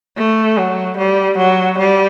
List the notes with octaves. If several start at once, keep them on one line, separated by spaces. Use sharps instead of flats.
A3
F#3
G3
F#3
G3